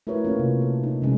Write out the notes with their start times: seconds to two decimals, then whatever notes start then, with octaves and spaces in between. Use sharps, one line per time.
0.07 A3 E4 F#4 A#4 B4 C#5
0.24 A#3 C#4 F4
0.39 C3
0.62 A4
0.84 D#4
1.02 C3 F3 G#3 C#4